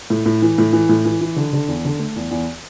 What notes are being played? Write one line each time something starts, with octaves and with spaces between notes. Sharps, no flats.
A2
A2
E3
A2
E3
A2
E3
E3
D3
D3
E2
D3
A3
E2
E2